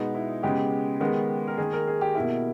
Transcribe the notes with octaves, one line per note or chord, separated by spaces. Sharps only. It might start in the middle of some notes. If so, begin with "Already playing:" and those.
Already playing: B2 G#3 B3 D#4
E4
C#3 G#3 B3 G4
D#3 G#3 B3
A#4
D#3 A#3 G#4
A#4
G#4
G4
B2 A#3 E4